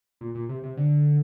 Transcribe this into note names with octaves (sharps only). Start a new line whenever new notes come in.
A#2
A#2
C3
C3
D3